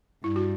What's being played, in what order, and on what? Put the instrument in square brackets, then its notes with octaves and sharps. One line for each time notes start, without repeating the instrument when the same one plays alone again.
[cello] G2 [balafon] E4
[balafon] F#4